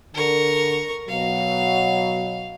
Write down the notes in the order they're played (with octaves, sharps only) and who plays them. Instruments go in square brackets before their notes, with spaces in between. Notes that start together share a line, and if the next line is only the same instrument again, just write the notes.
[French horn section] D3 [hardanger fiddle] A#4 C#6
[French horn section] B2 F#3 [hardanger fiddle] F5